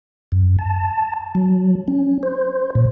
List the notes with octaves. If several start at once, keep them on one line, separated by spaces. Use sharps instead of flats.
F#2
A5
F#3
C#4
C5
A#2